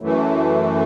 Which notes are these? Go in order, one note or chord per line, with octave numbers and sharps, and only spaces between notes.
F#2 E3 A3